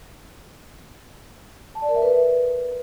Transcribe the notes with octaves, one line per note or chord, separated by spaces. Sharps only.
A5
D5
A#4
E5
B4